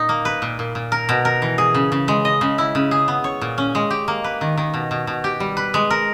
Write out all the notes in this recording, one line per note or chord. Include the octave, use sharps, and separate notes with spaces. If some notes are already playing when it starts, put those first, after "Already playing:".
Already playing: A#2 D#4
A#3
B4
A#2
A#2
A#2
A#4
B2
A#4
E3
G#4
C#3
C#3
G#3
D#5
C#3
E4
C#3
G#4
B3
C#5
A#2
C#4
G#3
G4
A#3
B4
D#3
D#3
B2
B2
B2
G4
G3
B4
G#3
A#4